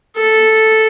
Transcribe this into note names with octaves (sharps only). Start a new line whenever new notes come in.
A4